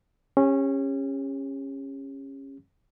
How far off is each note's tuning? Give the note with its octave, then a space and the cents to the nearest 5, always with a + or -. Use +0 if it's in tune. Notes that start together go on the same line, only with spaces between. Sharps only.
C#4 -20 G4 +45